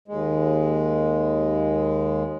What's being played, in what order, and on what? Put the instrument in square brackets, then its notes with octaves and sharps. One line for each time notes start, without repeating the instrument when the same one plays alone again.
[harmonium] D#2 G#3